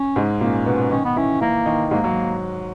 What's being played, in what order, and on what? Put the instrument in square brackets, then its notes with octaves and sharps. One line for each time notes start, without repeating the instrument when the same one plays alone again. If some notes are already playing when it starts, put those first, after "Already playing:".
Already playing: [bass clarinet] C#4
[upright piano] G#2 G#3
[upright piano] A#2 A#3 [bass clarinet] C#4
[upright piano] B2 B3
[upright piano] D#3 D#4 [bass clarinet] C#4
[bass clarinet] B3
[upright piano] E3 E4 [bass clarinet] C#4
[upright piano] E3 E4 [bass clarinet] A#3
[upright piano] D#3 D#4
[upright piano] G#2 G#3 [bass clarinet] A#3
[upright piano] F#3